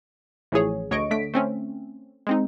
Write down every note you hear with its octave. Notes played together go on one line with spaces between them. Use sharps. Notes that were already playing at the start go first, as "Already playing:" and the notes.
A1 A2 E3 F3 G#4 C#5
D2 C#5 D#5 C#6 D7
D3 A3 B6 D7
A3 C4 C#4
G#3 C4 D#4